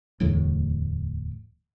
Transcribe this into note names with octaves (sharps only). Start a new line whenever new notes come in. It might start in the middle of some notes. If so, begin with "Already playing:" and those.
D1 E2 A2